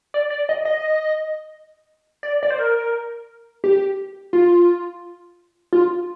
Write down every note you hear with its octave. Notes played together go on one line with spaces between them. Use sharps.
D5
D5
D#5
D#5
D5
D5
C5
A#4
G4
F4
F4